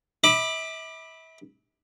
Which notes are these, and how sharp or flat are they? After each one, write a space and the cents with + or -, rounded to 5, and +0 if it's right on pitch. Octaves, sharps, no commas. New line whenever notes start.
E5 -40 B5 -5 D6 +20